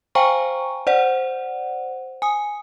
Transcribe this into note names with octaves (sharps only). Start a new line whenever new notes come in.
C5 F5 G5 G#5 A#5 C#6
C5 D5 F#5
G#5 D#6